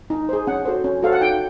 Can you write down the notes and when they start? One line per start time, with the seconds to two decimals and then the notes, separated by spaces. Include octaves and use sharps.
0.10 D#4
0.29 G#4 C5
0.47 C#4 F#5
0.65 F#4 A4 C5
0.84 C#4
1.03 F#4 A4 C5 F5
1.13 F#5
1.21 D#4 G5